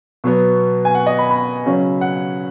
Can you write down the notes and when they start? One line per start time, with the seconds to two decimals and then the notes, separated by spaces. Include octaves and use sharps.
0.24 B2 F#3 B3
0.85 G#5
0.95 F#5
1.06 D#5
1.19 B5
1.31 B5
1.66 C#3 F#3 C#4
2.01 F#5